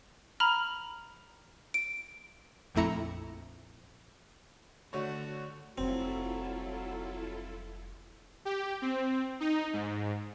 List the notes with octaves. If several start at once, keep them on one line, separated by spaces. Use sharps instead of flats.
A#5 B5 F6
D7
A#1 F2 A3 E4 A#5 C#7
D3 A3 F#4 C#5
F1 F#3 G3 C4 E4 F4 A4
G4
C4
D#4
G#2